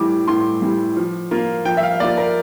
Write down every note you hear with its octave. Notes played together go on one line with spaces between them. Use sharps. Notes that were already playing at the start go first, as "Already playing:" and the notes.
Already playing: A2 E3 G3 D6
A2 C6
E3 G3
F3
A#3 F4
F3 G5
E5
F5
A#3 F4 D5
A#4